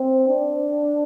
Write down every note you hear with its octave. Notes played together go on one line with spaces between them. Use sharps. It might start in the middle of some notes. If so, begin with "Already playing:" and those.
Already playing: C4
D4